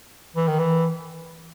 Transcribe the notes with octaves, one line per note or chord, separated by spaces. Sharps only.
E3
D#3
E3